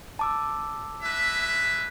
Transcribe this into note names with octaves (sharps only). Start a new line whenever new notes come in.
A5 D6 E6
G#3 B4 E5